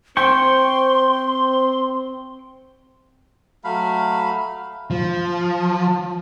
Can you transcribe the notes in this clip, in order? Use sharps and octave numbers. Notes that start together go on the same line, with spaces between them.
C4 C5 G5 C6 C#6
F#3 A3 F5 B5
F3